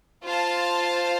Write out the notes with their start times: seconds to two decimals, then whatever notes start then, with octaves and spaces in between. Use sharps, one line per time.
0.24 F4 C5 F5 A5